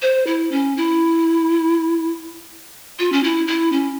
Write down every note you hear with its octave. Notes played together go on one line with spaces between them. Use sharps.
C5
E4
C#4
E4
F4
C#4
E4
E4
C#4